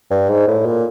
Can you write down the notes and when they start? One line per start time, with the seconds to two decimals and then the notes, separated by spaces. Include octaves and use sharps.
0.10 G2
0.29 G#2
0.48 A2
0.65 A#2